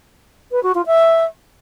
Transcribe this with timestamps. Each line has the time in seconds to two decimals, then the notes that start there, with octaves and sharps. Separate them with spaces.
0.52 B4
0.63 F#4
0.75 F4
0.86 E5